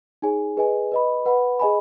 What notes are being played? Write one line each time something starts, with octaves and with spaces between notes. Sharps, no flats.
D#4 G#4 C#5 G#5
G#4 B4 D#5 G#5
B4 D#5 B5
B4 F#5 B5
G#4 D#5 G#5 B5